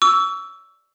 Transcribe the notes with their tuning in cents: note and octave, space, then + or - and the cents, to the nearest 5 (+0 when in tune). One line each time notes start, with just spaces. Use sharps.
C#6 +40 E6 +0